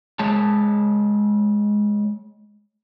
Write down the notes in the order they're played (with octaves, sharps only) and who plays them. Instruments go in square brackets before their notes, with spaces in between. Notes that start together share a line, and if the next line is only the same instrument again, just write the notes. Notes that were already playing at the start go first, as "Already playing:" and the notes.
[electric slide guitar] G#3 C#5 A5